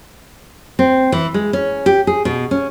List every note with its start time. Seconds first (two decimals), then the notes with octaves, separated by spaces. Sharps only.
0.79 C4
1.12 E3
1.34 G#3
1.53 C#4
1.86 G4
2.07 G#4
2.25 B2
2.51 C#4